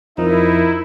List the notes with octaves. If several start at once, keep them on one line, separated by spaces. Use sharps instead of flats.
F2 F3 D#4 E4 A#4